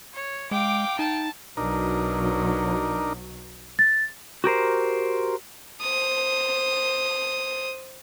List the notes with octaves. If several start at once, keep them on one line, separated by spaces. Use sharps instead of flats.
C#5
G#3 F5 G5 D6
D#4 A5
B1 F#3 D4 D#4 A#4
A6
F#4 G4 A#4 C5
C5 D#6